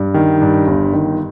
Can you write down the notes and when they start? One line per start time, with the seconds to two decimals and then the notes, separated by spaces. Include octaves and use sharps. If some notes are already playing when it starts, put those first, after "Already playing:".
Already playing: G2
0.14 D#3
0.41 G2
0.67 G1
0.93 D#3